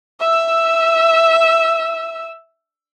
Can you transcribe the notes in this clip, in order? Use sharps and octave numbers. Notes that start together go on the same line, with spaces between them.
E5 E6